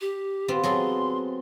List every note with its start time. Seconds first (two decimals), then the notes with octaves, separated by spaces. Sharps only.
0.01 G4
0.48 B3 C4 F4
0.63 F#3 G#4 A4 C6